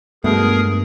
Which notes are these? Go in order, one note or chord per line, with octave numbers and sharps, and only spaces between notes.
G2 B2 G#3 A3 G#4 A#4 D#6